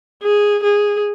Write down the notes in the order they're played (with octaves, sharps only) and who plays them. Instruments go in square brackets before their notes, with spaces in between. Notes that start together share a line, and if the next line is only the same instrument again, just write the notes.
[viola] G#4
G#4